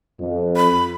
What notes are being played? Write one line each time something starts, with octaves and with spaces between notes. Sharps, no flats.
F2
B5